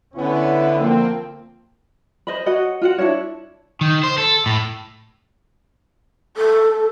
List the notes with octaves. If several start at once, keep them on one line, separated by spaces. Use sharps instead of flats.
D3 B3 C#4 E4
F3 A#3 C4
C5 D#5 B5
F#4 C#5 D#5 F#5
F4 F#4 F#5
D4 E4 F#4 C#5
D#3
C5
A4
A2
A4